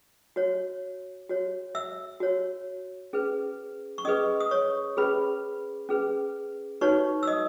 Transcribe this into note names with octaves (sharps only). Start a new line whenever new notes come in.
F#4 C#5
F#4 C#5
E5 E6
F#4 C#5
C#4 G#4 B4
C#6
C#4 G#4 B4 D#5 D#6
D#6
C#5 C#6
C#4 G#4 B4 B5
C#4 G#4 B4
D#4 F#4 B4 C#5 C#6
E6
D#5 D#6